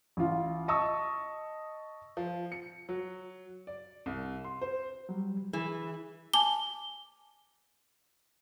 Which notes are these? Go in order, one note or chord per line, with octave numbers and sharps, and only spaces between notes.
A1 F4
D#5 A5 C#6 D#6 E6
F3
C#7
F#3
D5
C2
C6
C5
F#3 G3
E3 G#4
G#5 A5 D6 G7